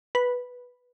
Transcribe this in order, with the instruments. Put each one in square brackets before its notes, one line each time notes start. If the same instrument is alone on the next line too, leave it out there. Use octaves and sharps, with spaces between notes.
[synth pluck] B4